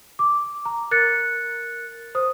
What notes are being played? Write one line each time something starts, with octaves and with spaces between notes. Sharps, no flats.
D6
A#5
A#4 F#6 A6 C#7
C5 D#6